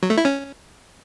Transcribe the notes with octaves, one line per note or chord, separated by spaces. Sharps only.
F#3
A3
E4
C#4